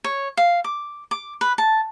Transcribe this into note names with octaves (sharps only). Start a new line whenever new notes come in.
C#5
F5
D6
D6
B4
A5